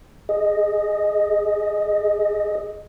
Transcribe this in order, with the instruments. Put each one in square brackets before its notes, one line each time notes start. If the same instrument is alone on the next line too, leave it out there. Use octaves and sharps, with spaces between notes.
[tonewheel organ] G#4 D#5